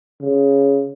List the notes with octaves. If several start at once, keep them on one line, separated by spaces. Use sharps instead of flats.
C#3